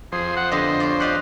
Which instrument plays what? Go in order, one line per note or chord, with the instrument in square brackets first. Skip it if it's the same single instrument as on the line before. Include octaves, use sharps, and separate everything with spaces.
[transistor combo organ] F2 C5 [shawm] G#4
[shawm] F#5
[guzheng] D3 B3 G4 [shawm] D#5
[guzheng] C#5 D5
[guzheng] F4 D#5 F#5 [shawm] G4